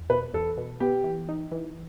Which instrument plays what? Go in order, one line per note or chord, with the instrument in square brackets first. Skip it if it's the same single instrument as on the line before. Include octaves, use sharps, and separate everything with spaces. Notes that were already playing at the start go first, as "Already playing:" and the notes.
Already playing: [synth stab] E2
[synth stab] B2 [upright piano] B4
[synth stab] E2 [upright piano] A4
[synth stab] B2
[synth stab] B3 [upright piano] G4
[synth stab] E3
D#4
E3